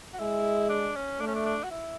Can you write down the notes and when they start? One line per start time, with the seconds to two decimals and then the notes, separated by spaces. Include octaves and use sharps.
0.13 F#4
0.19 G#3 E4
0.70 D4
0.96 C#4
1.20 A3 D4
1.27 C#4
1.35 D4
1.45 D4
1.63 F#4
1.71 E4